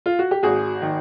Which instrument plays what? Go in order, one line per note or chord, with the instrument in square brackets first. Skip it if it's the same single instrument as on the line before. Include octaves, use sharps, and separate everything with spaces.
[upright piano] F4
F#4
G4
G#1 F#4 G#4
D#3